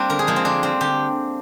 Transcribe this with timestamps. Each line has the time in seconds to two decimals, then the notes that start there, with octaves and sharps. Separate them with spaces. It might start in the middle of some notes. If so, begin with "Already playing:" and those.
Already playing: G3 A#3 C4 D4
0.10 D3 A#4
0.19 G#4
0.27 F3 G#3 A#3
0.36 C4
0.45 D3 D4
0.63 G3 C4
0.81 D3 G4